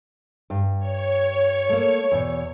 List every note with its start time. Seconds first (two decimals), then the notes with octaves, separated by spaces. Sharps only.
0.50 G2
0.79 C#5
1.69 A3 A#3
2.12 E2 B2